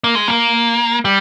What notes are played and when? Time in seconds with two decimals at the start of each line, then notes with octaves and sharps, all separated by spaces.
0.04 A#3
0.15 G#3
0.28 A#3
1.05 G3